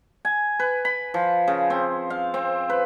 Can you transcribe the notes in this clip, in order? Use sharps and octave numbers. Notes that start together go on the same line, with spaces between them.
G#5
B4
B5
F3
C#3
C4
F5
C4
B4